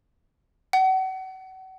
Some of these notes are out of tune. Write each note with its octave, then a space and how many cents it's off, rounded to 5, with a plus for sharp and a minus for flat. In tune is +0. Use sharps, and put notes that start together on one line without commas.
F#5 +35